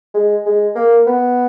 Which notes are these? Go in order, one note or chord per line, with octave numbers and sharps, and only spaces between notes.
G#3
G#3
A#3
B3